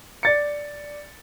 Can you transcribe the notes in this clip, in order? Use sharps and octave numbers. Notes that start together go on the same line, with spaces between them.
D5 A6 C#7